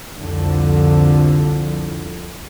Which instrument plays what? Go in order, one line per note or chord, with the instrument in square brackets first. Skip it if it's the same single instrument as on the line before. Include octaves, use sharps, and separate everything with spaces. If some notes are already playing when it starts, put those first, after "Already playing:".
[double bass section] C2 F2 D3 F3